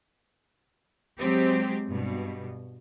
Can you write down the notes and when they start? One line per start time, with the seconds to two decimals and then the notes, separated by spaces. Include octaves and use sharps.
1.18 F#3 G#3 C4 G4
1.87 G2 B2